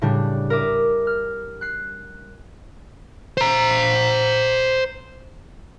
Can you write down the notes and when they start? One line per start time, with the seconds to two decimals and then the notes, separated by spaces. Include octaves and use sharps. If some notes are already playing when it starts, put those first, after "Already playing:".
0.01 A2 C#3 G3 D4
0.50 A#4 E5 D6 D#6
1.07 F6
1.61 F#6 C7
3.38 C5 A#5